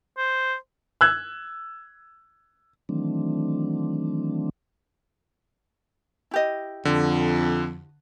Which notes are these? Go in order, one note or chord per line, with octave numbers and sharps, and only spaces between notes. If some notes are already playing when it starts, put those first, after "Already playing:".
C5
E6 F#6 G#6
D#3 E3 F#3 A3 C4 D4
E4 G4 D#5
F2 D3